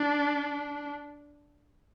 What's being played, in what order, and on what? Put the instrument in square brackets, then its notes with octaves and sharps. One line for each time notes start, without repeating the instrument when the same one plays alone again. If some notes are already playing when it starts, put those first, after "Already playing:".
Already playing: [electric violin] D4